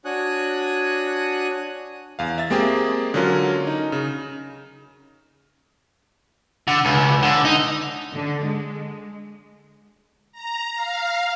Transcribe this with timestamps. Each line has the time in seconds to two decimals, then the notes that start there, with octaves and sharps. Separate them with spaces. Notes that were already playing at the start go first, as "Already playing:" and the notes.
0.05 D4 F#4 C#5 G#5 D#6 F#6
2.19 E2 F5
2.38 E5 A6
2.50 G#3 A#3 C4 G4 G#4
3.14 D3 F#3 C#4 F4 A#4
3.67 D#4
3.92 C#3
6.68 D3
6.85 C#2
7.23 D3
7.45 D#4
8.15 D3
8.44 G#3
10.32 A#5
10.75 F5